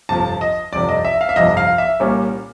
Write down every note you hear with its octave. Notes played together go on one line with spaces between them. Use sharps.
G1 F2 C3 F3 A5
D#5
G1 F2 C3 F3 D5
D#5
E5
F5
E5
G1 F2 C3 F3 D#5
F5
E5
C2 A#2 G3 A#3 C#4